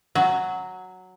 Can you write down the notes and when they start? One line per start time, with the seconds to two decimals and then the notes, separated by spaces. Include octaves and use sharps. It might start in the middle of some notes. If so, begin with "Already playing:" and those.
0.15 F#3